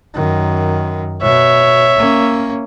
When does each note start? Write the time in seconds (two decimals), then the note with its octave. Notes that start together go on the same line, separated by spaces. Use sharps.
0.14 F#2 D#3
1.22 B2 C#5 E5
1.97 A#3 C#4